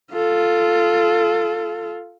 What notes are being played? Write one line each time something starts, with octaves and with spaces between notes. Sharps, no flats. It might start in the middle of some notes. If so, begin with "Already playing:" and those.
F4 A4